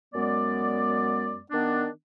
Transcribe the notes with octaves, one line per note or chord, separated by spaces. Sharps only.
F#2 G#3 B3 D5
D#3 B3 D4